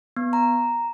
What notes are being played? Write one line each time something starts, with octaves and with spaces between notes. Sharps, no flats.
B3
A#5